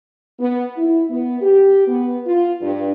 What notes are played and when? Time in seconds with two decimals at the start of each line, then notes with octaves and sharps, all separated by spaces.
0.40 B3
0.77 E4
1.09 B3
1.41 G4
1.87 B3
2.26 F4
2.62 G2